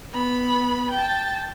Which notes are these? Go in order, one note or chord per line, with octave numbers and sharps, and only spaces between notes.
B3 B5
G5 A5